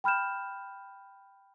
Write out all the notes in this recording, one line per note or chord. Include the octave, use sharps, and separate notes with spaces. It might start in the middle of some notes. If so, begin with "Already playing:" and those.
G5 B5 F6 G6 E7